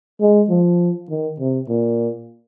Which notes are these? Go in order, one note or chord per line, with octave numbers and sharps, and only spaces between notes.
G#3
F3
D#3
C3
A#2